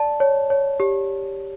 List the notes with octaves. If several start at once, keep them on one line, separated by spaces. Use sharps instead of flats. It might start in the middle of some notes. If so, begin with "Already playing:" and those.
Already playing: D5 A5
C#5
C#5
G4